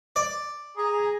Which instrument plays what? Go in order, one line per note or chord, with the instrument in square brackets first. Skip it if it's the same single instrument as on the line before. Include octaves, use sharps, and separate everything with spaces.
[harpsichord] D5
[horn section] G#4 G#5 A#5